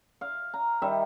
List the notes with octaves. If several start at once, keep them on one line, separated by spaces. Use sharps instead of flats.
F5
A#5
D#3 G3 E5